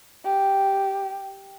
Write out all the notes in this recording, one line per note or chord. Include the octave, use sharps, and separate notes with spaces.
G4